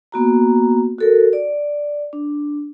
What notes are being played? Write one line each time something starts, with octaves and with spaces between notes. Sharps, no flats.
A#3 B3 F#4 A#5
F#4 A4 A#4
D5
D4